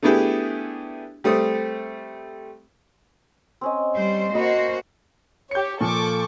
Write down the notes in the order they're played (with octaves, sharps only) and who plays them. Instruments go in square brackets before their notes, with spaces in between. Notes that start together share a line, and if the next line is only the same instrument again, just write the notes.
[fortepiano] A3 B3 D4 E4 G4 G#4
G3 A3 C4 D#6
[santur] C4 C#4 D#5
[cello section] G3 C5
[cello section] A#3 F#4 C5 [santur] A#4 D#5 B5
[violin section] G4 C#5 [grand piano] G6 C#7
[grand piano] A#2 F3 [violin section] A4 C#6 D6